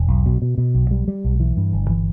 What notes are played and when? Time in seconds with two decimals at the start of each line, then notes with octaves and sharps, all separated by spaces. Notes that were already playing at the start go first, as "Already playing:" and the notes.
Already playing: E1
0.08 B1
0.26 B2
0.42 B2
0.58 B2
0.75 B1
0.91 G3
1.08 G3
1.24 B1
1.40 E3
1.57 G2
1.73 G1
1.90 E3